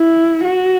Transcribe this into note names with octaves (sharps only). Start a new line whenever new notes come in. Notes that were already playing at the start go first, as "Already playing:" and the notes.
Already playing: E4
F#4